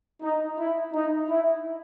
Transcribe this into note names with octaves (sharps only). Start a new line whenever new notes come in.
D#4
E4
D#4
E4